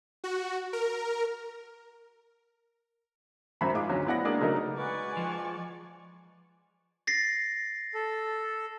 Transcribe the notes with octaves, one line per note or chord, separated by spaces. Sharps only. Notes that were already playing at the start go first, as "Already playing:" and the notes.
F#4
A#4
G#1 F#2 C5 E5 A#5 B5
G#2 G#3 F4 D6
D2 F#3 C#4
B3 E4 D5 F#5 A#6
G#3 A#3 D4 G#4 D5
C#3 F#3 A3 D#4 A#4
G#3 F#4 B4 D5 G#5 C#6
F3
A6 A#6 C7
A4